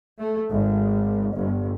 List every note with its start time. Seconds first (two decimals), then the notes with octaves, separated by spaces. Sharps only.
0.19 A3
0.52 G#1
1.35 G1